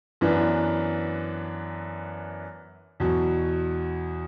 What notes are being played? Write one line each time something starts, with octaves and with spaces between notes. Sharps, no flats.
F#2 E3 B3 D4
E2 B2 F#3